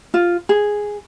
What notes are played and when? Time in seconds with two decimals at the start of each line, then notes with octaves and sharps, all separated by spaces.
0.14 F4
0.49 G#4